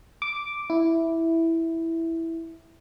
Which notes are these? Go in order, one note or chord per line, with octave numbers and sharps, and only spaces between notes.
D6
E4